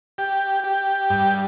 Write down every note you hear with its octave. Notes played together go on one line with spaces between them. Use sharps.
G4
G4
G2